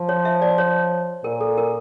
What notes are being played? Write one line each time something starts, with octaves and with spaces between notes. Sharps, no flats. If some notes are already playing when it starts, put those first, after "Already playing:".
Already playing: F3
C#5
E5
D5
C#5
A#2 A#4
A4
A#4